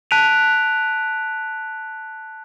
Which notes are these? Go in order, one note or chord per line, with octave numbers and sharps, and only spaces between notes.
A5 F#6 B6 D7 D#7 F7